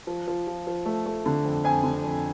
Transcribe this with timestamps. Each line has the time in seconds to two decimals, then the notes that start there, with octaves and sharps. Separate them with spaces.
0.07 F3
0.27 F3
0.47 F3
0.67 F3
0.86 A3
1.06 A3
1.26 D3
1.45 F2
1.64 F2 G#5
1.83 D3
2.04 F2